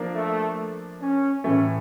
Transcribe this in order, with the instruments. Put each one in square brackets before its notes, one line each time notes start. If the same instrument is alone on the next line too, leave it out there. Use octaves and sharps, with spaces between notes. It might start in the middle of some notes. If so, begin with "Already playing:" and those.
Already playing: [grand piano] F3 A#3 D4
[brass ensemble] A3
C#4
[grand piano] A2 E3 A3 [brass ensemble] C#4